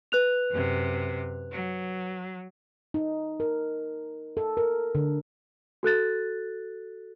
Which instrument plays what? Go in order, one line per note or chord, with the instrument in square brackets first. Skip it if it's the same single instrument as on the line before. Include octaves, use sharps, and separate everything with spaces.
[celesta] B4 F#6 F7
[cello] F#2 C3
F#3
[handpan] D#4
A#4
A4
A#4
D3
[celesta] F#4 A4 F#6 A6